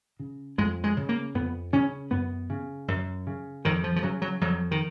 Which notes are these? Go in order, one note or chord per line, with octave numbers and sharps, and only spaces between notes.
C#3
F2 G#3
G#3
C#3
A#3
F2 B3
C#3 C#4
F#2 B3
C#3
F#2
C#3
F2 D#3
F3
F3
C#3 F#3
F#3
F2 F#3
D#3